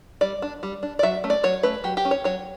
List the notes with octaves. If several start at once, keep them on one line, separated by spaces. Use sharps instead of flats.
G3 D5
D4
G3
D4
D5
F#3 E5
A3 C#4
D5
F#3 C#5
A3 C#4 B4
F#3 G4
G4
C#4
C#5
F#3 C#5